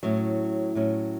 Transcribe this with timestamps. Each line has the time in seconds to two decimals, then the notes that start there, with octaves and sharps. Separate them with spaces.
0.03 A2 F#3 C#4
0.75 A2 F#3 C#4